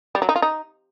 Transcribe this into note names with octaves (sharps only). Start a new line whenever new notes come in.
G3
F#3
D#4
F4
D#4